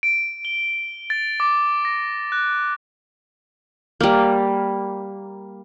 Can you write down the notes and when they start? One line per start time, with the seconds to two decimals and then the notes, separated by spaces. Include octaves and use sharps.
0.03 D7
0.45 G7
1.10 A6
1.40 D6
1.85 A#6
2.32 F#6
4.01 G3 A#3